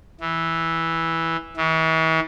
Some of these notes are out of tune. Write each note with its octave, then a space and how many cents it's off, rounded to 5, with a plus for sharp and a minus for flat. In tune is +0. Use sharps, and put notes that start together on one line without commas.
E3 -5
E3 -40